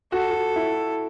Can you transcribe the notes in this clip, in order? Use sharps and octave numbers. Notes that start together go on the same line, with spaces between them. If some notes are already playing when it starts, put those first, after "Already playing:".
F#4 A4
F#4
E4